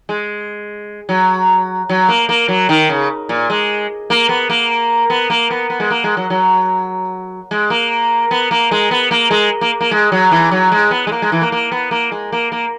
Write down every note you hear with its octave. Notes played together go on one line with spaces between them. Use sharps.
G#3
F#3
F#3
A#3
A#3
F#3
D#3
C#3
A#2
G#3
A#3
B3
A#3
B3
A#3
B3
B3
G#3
A#3
G#3
F#3
F#3
G#3
A#3
B3
A#3
G#3
B3
A#3
G#3
A#3
A#3
G#3
F#3
E3
F#3
G#3
B3
G#3
A#3
G#3
E3
A#3
A#3
B3
A#3
G#3
A#3
A#3